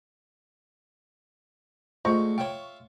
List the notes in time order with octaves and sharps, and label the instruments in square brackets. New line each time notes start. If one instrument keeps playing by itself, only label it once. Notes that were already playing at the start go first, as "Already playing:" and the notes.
[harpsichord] D2 G#3 [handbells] F4 C5 D#5 [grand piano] C#6
[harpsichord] F4 E5 C6 [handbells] C#5 G5